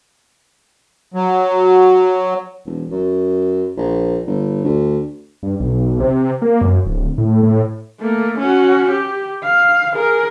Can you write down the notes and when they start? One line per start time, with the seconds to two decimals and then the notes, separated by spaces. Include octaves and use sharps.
1.14 F#3
2.66 E1
2.91 F#2
3.77 A#1
4.27 G1
4.65 D2
5.43 G2
5.60 B1
6.00 C3
6.42 A#3
6.61 F#2
6.85 D1
7.18 A2
7.43 A2
8.01 A3 A#3
8.39 C#4 F#4
8.91 G4
9.43 F5
9.93 G#4 A#4